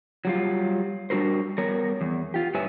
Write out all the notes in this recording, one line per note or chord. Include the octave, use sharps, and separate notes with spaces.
F#3 G3 F4
G3 D4 F#4 A#4 C5
G3 B3 A#4 C#5
E2
F4 G4
G2 B4 C#5 E5 G#5